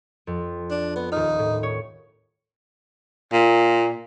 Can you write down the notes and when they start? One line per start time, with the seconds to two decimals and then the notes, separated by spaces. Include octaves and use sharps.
0.27 F2
0.71 D4
0.96 B3
1.12 D#1 D#4 F6
1.39 A2
1.63 C#5
3.33 A#2